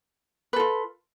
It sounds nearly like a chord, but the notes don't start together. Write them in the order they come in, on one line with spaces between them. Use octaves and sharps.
B4 A4 F4